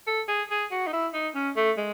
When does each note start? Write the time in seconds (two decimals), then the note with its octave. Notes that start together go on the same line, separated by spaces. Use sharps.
0.07 A4
0.28 G#4
0.51 G#4
0.71 F#4
0.87 D#4
0.93 E4
1.14 D#4
1.35 C#4
1.57 A3
1.77 G#3